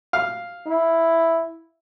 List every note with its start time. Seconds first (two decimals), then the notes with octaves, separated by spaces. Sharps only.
0.13 F5
0.67 E4